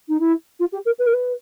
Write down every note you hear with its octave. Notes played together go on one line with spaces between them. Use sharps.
D#4
E4
F4
G4
A#4
B4
A#4
B4